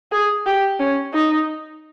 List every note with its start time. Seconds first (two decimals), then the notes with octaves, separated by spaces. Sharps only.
0.12 G#4
0.46 G4
0.80 C#4
1.13 D#4